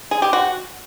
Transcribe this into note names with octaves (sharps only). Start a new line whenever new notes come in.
G#4
G4
F#4